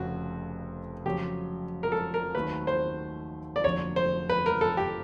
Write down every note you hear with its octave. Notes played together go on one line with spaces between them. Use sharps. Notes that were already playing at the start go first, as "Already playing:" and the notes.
Already playing: F1 F2 C#3 F#4
F2 C#3 F#3 G4
A#4
A4
A#4
D#2 D#3 F#3 A3 C4 B4
C5
D5
F1 F2 D3 F#3 A#3 C#5
C5
B4
A#4
A4
G4